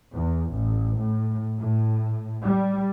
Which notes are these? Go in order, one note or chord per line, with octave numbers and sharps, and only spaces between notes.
E2
A1
A2
A2
G3